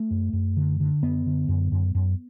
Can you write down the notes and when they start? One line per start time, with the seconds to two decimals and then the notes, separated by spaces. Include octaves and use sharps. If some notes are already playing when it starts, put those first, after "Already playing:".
Already playing: A3
0.11 F#2
0.33 F#2
0.57 D3
0.80 D3
1.03 F#2 B3
1.26 D3
1.48 F#2
1.72 F#2
1.95 F#2